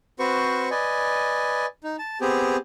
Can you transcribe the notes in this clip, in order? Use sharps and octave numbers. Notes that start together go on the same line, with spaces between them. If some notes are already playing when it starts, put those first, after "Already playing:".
C4 F#4 B4 C5 C#6
B4 D5 D#5 G#5
D#4
A5
B3 C4 G4 G#4